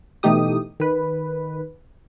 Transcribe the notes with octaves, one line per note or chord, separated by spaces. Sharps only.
B2 E3 A3 D#4 G4 D#6
D#3 B4